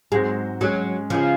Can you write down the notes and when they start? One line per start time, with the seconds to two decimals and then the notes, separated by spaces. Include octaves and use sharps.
0.12 G#2 F#3 G#3 C4 F#4 C5
0.61 F#3 G#3 C#4 G#4
1.10 C#3 F3 G#3 C#4 G#4